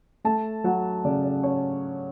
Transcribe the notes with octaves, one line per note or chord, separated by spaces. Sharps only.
A3 A5
F#3 F#5
C#3 D5
D5
C#4 C#5